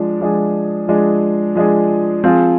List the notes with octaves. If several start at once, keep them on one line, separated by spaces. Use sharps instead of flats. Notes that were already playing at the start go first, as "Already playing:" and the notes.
Already playing: F3 G#3 D4
F3 G#3 D4 G#4
F3 G#3 D4 G#4
F3 G#3 D4 G#4
F3 C4 F4 G#4